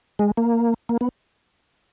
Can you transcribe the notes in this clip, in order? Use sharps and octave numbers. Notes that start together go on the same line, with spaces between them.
G#3
A#3
A#3
B3